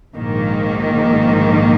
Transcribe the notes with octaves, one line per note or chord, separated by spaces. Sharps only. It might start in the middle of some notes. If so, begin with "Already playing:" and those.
A#1 G#2 D#3 A#3